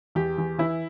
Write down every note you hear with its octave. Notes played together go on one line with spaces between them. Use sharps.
E2 G4
E2
E3 E4